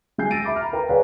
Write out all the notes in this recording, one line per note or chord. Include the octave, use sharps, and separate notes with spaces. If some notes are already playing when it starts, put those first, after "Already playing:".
G#3 G5 G#5 G6 C7
E6 A6 A#6 D7 D#7
E5 B5 D6
A#5 F6
A#4 B4 G5 A#5
G#4 B4 C#5 D5 F5 G#5